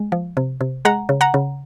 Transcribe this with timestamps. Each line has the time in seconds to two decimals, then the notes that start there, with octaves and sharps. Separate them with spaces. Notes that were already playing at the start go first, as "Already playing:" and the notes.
Already playing: G#3
0.12 F3
0.37 C3
0.61 C3
0.85 G#3 F#5 A#5
1.09 C#3
1.21 F#5 A#5
1.34 C#3